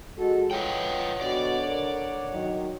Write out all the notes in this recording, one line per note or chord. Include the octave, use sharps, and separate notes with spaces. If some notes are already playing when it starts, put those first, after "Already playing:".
G#3 F#4 A4
F4 B4 C#5 D#5 F#5 G5
B2 D3 D5
A#4
D#3 F#3